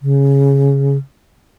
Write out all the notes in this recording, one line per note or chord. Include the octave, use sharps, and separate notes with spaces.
C#3